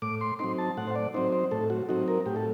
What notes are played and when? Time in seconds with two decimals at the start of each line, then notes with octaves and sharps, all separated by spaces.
0.02 A2 D6
0.21 C6
0.39 F#3 C4 D#4 C6
0.58 A5
0.77 A2 F#5
0.87 C5
0.95 D5
1.14 F#3 C4 D#4 C5
1.32 C5
1.51 A2 A4
1.70 F#4
1.89 F#3 C4 D#4 F#4
2.08 A#4
2.26 A2 G4
2.36 A4